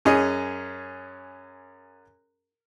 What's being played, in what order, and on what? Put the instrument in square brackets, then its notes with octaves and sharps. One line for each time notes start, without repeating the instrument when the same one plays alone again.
[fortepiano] F#2 C#4 G#4 D#5